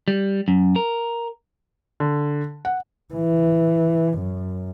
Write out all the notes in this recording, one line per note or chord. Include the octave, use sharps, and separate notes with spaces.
G3
F#2
A#4
D3
F#5
E3
F#2